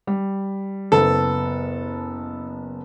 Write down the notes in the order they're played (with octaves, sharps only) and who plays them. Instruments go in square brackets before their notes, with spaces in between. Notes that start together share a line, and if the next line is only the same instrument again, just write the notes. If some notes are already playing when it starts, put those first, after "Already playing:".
[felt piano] G3
[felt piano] F#1 B3 A5 [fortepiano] A4